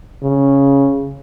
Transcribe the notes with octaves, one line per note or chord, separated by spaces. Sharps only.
C#3